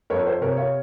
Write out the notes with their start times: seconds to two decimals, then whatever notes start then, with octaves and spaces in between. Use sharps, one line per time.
0.10 F2 A#4 C#5
0.27 C5
0.41 C3 A#4 C#5
0.57 C#5 F5